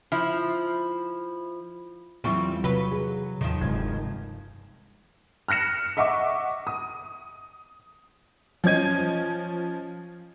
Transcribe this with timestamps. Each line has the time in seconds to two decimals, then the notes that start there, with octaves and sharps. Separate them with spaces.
0.12 F3 E4
2.24 E2 F#3 G3 C4 F4 E5 C#6
2.64 C3 F#3 B4
2.91 G#4
3.41 D#2 D#3 F3
3.61 F1 G2 C3 G#3 G#6
5.48 F6 F#6 A#6 C#7 E7
5.97 D#5 E5 F#5 C#6 D6
6.67 D#6
8.64 F3 C#4 D#5 G#6 D#7